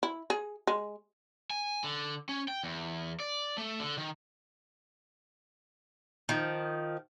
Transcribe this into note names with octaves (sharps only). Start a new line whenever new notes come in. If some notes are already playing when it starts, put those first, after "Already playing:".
E4
G#4
G#3
G#5
D3
C#4
G5
E2
D5
A3
D3
D#3
D#3 F3